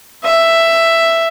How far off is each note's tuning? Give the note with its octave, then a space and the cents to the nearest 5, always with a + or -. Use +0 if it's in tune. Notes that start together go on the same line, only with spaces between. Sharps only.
E5 +5